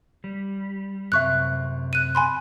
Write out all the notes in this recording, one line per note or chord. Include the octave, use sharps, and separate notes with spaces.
G3
F#2 C3 E5 C#6 F#6
F#6 D#7
G#5 B5 C6